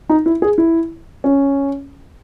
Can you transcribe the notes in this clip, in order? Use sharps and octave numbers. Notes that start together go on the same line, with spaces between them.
D#4
E4
G#4
E4
C#4